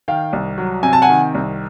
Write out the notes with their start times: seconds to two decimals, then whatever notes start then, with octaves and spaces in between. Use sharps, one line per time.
0.08 D#3 F5 G5
0.33 C2
0.58 F#3
0.83 C3 G#5
0.93 A5
1.02 F#5 G#5
1.09 D#3
1.35 C2